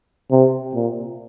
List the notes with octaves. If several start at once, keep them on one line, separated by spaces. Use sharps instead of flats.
C3
A#2